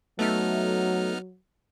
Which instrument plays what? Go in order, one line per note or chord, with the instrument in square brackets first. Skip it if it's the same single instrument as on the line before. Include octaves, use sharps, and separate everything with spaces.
[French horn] F#3 [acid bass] A3 [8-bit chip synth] B3 D#4 F6